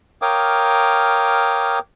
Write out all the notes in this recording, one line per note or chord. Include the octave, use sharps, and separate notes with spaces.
A#4 C#5 F5 G5 D6 D#6